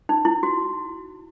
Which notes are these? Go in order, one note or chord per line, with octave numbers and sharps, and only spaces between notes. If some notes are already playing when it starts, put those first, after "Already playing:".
D#4
E4
F#4